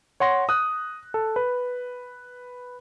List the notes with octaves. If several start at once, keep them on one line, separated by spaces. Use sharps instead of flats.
C#5 F#5 C6 A#6
D#6 F#6
A4
B4